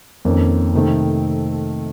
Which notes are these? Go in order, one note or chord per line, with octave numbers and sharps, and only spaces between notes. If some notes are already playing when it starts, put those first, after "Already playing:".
F2 D#3 A#3 C#4
C3 D#3 A3 C4